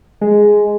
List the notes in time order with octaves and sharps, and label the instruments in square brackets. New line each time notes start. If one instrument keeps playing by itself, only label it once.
[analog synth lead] G#3